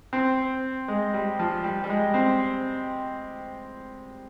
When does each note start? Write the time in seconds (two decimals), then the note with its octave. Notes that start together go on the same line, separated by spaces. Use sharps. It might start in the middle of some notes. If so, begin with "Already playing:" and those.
0.13 C4
0.88 G#3
1.14 G3
1.39 F3
1.64 G3
1.84 G3
1.90 G#3
2.14 C4